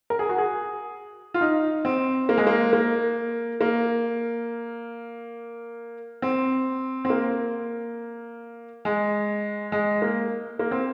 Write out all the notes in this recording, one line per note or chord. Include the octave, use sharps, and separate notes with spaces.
A#4
G#4
F#4
G#4
F4
D#4
C4
A#3
G#3
A#3
A#3
A#3
C4
C4
A#3
G#3
G#3
A#3
A#3
C4